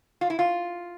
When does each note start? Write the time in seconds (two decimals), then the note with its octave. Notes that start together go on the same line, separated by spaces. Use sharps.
0.21 F4
0.30 E4
0.39 F4